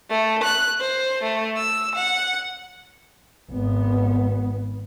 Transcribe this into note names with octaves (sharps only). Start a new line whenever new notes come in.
A3
F#6
C5
A3
E6
F#5
G#1 B3